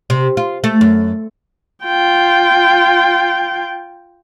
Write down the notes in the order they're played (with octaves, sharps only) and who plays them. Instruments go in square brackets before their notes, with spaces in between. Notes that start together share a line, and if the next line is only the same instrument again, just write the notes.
[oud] C3
F4
A3
F#2
[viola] F4 G5